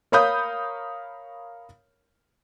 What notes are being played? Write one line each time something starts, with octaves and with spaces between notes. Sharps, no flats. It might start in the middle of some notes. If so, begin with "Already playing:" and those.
A#4 C#5 F5 B5 D#6 G6